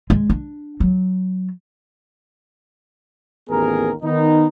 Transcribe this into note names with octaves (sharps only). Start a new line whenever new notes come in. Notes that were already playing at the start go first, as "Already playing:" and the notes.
G#3
D4
F#3
A1 D#2 B3 G#4 A#4
D#3 B3 D#4